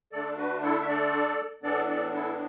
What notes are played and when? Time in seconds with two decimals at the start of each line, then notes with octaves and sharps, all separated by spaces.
0.12 D3 A3 D4 A4 D5
0.37 F#4 B4
0.63 E4 A4
0.80 E5
0.88 A4 D5
1.63 A2 E3 B3 D4 A4 D5
1.88 A4 D5
2.14 E4 A4